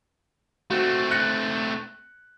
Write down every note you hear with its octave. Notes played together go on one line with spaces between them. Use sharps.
A3 C4 F#4
F#6 A#6 C#7